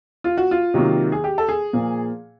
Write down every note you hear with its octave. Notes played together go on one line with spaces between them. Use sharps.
F4
F#4
F4
C3 D#3 F#3 A#3
G#4
G4
A4
G#4
A#2 F3 A#3